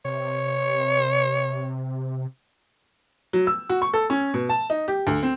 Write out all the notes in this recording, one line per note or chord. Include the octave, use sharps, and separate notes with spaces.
C3 C#5
F#3
E6
F#4
C#6
A4
C#4
B2
A5
D#4
G4
D2
C4